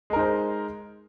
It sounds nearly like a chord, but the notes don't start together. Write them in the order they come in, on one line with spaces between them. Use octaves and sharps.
G#3 A#4 D#4 C5